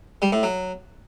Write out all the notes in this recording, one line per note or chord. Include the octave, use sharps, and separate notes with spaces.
G3
A2
F#3